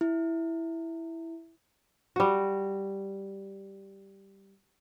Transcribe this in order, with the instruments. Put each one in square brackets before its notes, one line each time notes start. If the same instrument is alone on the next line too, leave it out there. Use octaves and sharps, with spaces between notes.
[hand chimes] E4
[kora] G3 F#4